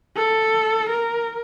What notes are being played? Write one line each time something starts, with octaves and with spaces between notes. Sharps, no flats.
A4
A#4